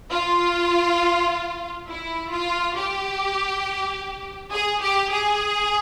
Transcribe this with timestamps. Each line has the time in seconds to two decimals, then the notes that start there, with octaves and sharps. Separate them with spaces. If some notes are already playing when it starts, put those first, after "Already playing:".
0.11 F4
1.88 E4
2.32 F4
2.77 G4
4.52 G#4
4.82 G4
5.12 G#4